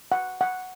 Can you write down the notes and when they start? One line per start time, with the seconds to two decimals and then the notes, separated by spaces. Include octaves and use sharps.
0.12 F#5
0.41 F#5